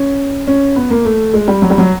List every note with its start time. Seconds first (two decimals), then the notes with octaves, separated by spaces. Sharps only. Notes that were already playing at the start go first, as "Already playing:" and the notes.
Already playing: C#4
0.47 C#4
0.76 B3
0.90 A#3
1.05 A3
1.34 G#3
1.48 G3
1.62 F#3
1.70 G3
1.78 F#3